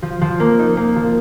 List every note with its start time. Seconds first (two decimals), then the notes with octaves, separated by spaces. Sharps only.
0.02 F3
0.21 F3
0.40 A#3
0.59 D#4
0.77 A#3
0.96 F3